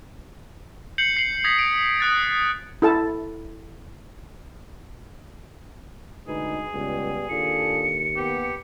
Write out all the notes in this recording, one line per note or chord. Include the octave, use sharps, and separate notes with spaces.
G6 C7 C#7 F#7
C7 F#7
D#6 G#6 A#6 B6
D7
D#6 F#6 A6
E4 A4 A5
D2 G#3 D#4 G#4 B4
C#2 G3 B3
D#2 D4 F4 A4 C#7
A#3 B3 G4